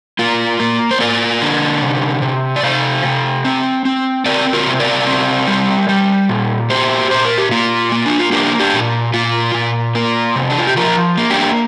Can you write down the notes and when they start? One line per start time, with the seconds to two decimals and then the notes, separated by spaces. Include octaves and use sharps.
0.19 A#3 F4
0.60 A#3
0.91 C5
1.00 A#3 A#4 D5
1.41 D3
1.82 C3
2.22 C3
2.56 D5
2.63 C3 C5 F5
3.04 C3
3.45 C4
3.85 C4
4.26 C4 A#4 D5
4.53 F4 A#4
4.67 C3
4.79 A#4 D5
5.07 C4
5.47 G3
5.89 G3
6.29 A#2
6.69 A#3 G4 C5
7.11 A#2 C5
7.25 A#4
7.38 G4
7.51 A#3 F4
7.92 A#3
8.06 D4
8.19 F4
8.32 A#3 D4 G4
8.60 D4 G4
8.73 A#2
9.14 A#2 F4
9.54 A#2
9.95 A#3 F4 A#4
10.36 C3
10.50 D4
10.59 F4
10.67 G4
10.76 F3 F4 A#4
11.17 A#3
11.30 D4 G4